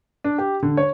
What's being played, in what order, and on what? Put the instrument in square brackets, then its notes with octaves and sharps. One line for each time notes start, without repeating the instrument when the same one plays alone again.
[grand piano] D4
G4
D3
C#5